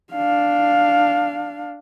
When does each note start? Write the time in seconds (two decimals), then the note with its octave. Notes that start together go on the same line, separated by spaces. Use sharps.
0.12 D4 F5